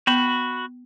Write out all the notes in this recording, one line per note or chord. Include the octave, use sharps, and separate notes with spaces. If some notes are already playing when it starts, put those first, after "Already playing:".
B3 F#4 B5